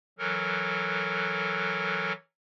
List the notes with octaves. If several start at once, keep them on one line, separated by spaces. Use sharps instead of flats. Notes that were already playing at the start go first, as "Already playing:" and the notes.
E3 F#3 A4 A#4